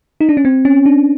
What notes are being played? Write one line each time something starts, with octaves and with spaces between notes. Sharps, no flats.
D#4
D4
C#4
C4
C#4
D4